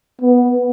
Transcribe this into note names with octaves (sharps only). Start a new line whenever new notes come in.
B3